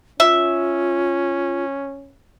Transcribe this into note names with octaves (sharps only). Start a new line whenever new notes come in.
C#4 F4 E5